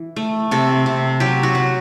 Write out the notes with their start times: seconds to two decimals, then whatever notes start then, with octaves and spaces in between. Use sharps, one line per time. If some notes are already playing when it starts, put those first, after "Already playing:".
Already playing: E3
0.16 A3
0.51 C3 A4
0.86 C3
1.20 F#3 G4
1.43 F#4
1.55 F#3